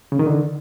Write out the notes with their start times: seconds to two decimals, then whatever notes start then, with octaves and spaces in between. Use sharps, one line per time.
0.12 C#3
0.19 D#3
0.27 D3